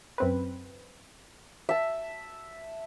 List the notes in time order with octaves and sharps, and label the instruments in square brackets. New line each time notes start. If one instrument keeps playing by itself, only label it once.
[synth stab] F#2 C4 B4
[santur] E5 A5